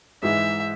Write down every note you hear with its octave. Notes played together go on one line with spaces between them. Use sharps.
G#2 E3 G#3 E5